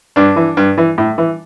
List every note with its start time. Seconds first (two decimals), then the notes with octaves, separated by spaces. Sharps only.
0.16 G2 D4
0.36 E3
0.57 G2
0.78 E3
0.98 A2
1.18 E3